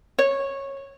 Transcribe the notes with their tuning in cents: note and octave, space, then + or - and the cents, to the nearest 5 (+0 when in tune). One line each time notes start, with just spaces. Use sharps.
C#5 -10